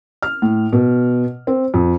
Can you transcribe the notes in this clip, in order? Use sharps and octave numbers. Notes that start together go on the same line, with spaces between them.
F6
A2
B2
C4
F2